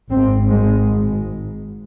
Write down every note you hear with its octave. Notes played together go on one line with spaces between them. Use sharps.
G#1 G#2 C4
G#3